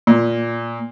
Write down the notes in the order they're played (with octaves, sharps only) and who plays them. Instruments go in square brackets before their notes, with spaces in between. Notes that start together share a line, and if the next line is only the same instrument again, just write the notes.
[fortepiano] A#2